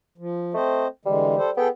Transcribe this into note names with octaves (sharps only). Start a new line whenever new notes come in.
F3
A3 C4 C5 D#5
D3 E3 G3 G#3
A4 C5
B3 G#4 A4 G5